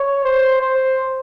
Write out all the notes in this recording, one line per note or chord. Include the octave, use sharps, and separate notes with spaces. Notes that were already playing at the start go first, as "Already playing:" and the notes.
Already playing: C#5
C5
C5